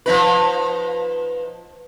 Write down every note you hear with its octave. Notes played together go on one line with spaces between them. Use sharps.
F3 D#4 B4